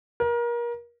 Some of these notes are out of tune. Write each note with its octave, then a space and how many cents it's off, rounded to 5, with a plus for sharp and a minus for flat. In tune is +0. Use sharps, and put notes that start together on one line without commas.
A#4 +30